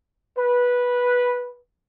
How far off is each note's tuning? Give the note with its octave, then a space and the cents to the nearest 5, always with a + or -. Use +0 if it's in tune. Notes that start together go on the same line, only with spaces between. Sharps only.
B4 -10